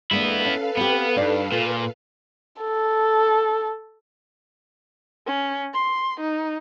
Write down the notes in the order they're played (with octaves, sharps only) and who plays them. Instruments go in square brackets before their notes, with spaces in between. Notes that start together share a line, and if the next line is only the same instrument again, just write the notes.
[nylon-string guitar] G#3 A#3 D4 [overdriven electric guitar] B3 E4 [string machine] A4 B4 F5
[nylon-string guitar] C#4
[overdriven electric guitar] B3 [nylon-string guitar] C4 G4
[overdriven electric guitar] G2 [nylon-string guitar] D#4 D5
[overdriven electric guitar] A#2 [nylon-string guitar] F4
[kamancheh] A4
C#4
C6
D#4